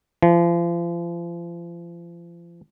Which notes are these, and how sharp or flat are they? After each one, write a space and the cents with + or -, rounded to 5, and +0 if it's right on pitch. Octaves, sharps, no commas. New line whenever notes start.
F3 -35